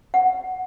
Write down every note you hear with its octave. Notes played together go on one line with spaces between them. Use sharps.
F#5